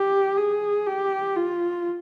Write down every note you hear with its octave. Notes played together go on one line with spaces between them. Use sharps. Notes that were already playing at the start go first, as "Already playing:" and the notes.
Already playing: G4
G#4
G4
F4